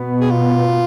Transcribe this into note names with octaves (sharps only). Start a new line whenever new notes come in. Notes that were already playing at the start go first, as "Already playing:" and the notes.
Already playing: B2 B3
G#4
F4